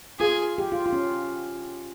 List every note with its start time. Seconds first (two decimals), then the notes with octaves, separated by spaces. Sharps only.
0.19 F4 G#4
0.58 G4
0.72 F4
0.86 F4
0.93 C#4